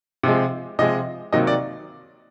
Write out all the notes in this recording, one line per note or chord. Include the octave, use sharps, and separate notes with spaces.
C3 F3 G#3
C3 F3 G#3 D#5
C3 D#3 F#3 A#3 D#5
D5